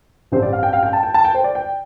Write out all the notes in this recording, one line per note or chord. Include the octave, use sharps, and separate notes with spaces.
A1 G2 G3 C4 C5
D5
F5
G5
F5
G5
A5
G5
A5
G5
C5
D5
G5